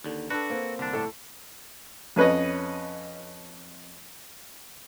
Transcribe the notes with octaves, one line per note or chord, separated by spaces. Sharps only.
D#2 D3
D4 F#4 A4 B4
A#3 C4
C2 D3 D4
A2 A4
F2 C#4 B4 C#5 D#5